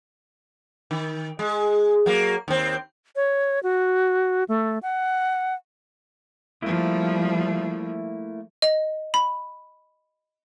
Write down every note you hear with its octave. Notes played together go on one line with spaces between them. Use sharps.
D#3
G#3
F#3 A#3
D#2 C4
C#5
F#4
A3
F#5
F3 G3 A3 A#3 E4
D#5
B5